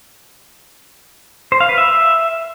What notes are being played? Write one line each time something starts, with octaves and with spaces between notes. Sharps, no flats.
C5
F5
B4
E5